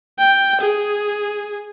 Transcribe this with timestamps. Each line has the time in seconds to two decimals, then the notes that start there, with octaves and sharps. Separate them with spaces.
0.19 G5
0.62 G#4